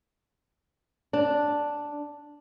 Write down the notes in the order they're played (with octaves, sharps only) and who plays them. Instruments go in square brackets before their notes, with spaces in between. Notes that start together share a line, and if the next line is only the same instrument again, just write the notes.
[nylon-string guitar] D4